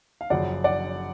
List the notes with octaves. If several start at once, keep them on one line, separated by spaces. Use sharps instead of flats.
F5
F#1 F#2 C#3 F3 D5 F#5
D5 F#5